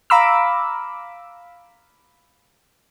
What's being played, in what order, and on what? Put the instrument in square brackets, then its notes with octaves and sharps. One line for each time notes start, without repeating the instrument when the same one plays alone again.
[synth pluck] F5 A#5 B5 D6 E6